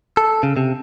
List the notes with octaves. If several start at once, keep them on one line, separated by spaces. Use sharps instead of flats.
A4
C#3
C3